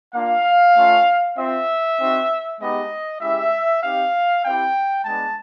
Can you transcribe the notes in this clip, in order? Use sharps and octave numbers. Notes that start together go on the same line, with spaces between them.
A#3 D4 F4 F5
A3 C#4 F4
C4 F4 E5
C4 D#4 F#4
G#3 B3 D#4 G4 D#5
G#3 C#4 E4 G4 E5
C4 D#4 G4 F5
C4 E4 G4 G5
G#3 B3 D4 A5